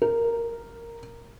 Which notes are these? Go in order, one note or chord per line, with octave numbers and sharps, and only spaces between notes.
A#4